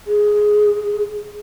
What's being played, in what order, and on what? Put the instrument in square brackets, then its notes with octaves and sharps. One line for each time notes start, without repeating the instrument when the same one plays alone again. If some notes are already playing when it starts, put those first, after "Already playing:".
[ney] G#4